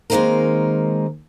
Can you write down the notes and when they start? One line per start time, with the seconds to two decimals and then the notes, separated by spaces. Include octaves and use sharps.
0.10 D#3 G#3 A#3 C4 D#4 A#4